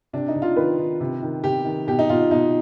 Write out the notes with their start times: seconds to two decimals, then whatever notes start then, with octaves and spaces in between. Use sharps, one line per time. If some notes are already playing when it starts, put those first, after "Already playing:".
0.13 C3 D4
0.28 D#4
0.35 C3
0.42 F4
0.56 D#3 B4
0.79 D#3
1.00 C3
1.22 D#3
1.44 C3 G4
1.65 D#3
1.87 B2 G4
1.99 D#4
2.09 B2 F4
2.30 B2 D#4